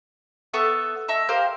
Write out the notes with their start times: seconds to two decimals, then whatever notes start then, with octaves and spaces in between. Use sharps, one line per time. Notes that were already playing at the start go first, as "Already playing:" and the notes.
0.54 B3 A4 E5 C#6
1.08 D#5 E5 A5 C#6
1.29 G4 A#4 C5 F5